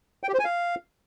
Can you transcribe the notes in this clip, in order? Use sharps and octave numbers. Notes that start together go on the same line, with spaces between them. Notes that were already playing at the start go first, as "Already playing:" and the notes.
G5
G4
C5
G#5
F5